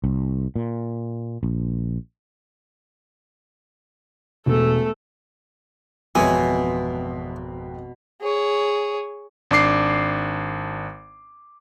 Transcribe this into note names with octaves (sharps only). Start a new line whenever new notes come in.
C2
A#2
A#1
E1 A3 A4
G#1 F2 B2 E3 F3 G#3 C#5 G#5
G#4 C#5
G#1 D4 D6 C7